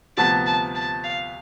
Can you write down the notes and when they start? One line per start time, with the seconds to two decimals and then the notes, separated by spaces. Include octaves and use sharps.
0.17 D2 C3 F3 B3 A5
0.46 A5
0.75 A5
1.04 F5